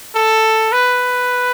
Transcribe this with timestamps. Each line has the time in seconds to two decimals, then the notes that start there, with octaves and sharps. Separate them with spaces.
0.15 A4
0.72 B4